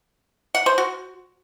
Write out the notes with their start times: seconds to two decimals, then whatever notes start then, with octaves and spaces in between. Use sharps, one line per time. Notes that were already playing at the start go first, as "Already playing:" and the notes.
0.55 F#5
0.66 C5
0.78 F#4